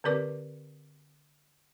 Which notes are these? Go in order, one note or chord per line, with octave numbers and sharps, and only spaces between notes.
D3 C4 G4 B4 D5 D6